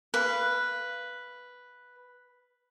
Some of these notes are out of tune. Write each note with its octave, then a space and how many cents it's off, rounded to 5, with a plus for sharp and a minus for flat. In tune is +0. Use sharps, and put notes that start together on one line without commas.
B4 +0 F5 -20